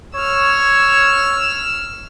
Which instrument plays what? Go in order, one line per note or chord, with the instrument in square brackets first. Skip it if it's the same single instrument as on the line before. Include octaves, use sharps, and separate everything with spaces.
[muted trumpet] C#5 [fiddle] E6 F6